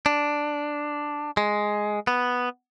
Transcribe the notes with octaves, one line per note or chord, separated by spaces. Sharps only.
D4
G#3
B3